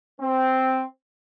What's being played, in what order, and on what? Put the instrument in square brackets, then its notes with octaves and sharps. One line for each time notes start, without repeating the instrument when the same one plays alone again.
[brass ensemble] C4